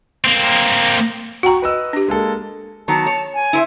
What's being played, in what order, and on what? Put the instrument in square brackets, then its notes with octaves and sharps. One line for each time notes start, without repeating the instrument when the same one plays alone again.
[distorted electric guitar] A#3 C4
[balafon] F#4 G5 A#5 [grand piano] F#5 C#6
[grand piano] B4 D#5 E6
[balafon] D4 G4
[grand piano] G#3 A#3 A4
[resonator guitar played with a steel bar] D#3 F#3 B3 [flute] A5
[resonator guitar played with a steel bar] C#5
[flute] G#5
[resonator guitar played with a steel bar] E4 C5 E5